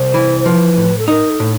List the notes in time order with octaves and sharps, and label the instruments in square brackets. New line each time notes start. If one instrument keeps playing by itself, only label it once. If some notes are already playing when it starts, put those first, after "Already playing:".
Already playing: [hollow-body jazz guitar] C2 [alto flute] C5
[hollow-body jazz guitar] E3
[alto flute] C5
[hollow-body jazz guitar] F3 [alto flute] B4
[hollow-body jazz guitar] A2
[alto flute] A4
[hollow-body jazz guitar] D#4 [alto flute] A#4
[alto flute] A4
[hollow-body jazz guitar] A2